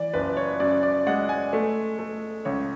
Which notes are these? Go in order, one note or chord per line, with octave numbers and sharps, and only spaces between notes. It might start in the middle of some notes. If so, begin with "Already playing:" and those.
Already playing: E3 D5
F#1 B4
C#5
F#2 D5
D5
G#3 F#5
G#5
A3
A3
C#2 C#5